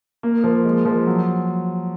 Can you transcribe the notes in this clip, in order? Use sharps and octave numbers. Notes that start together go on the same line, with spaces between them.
A#3
F3
G#3
F3
F#3